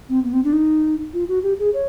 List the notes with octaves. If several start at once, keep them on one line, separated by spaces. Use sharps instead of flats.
C4
B3
C4
D4
D#4
F4
F#4
G4
G#4
C#5